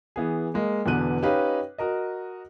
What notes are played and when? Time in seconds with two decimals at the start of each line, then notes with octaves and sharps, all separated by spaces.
0.16 E3 B3 G#4
0.54 G#3 A#3
0.86 E2 B2 D3 F#6 D#7
1.22 C#4 D#4 G4 B4 D#5 F5
1.78 F#4 A#4 D#5